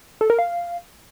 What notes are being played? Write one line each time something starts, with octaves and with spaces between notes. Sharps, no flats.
A4
A#4
F5